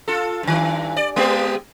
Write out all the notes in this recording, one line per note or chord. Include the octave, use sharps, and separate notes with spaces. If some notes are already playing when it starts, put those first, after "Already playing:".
F4 A4
G2 D#3
D5
G#3 B3 G4